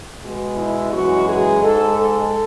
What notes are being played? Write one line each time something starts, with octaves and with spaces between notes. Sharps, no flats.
B2 G#3
E4
F#2 E3 G#3 F#4
G#4
G#2 G#3 A4
A4